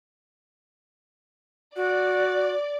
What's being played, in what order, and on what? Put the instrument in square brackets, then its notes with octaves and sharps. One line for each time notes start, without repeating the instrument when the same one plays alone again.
[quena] F#4 [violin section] D5